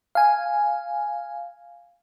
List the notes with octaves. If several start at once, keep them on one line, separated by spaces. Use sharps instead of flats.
F5 G#5